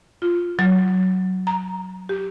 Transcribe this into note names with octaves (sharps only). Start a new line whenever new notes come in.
F4
F#3
A#5
G4